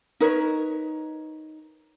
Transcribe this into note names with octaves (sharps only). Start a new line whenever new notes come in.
D#4 A#4 B4 C#5